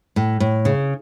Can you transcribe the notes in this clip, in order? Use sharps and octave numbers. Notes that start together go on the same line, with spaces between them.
A2
A2
C#3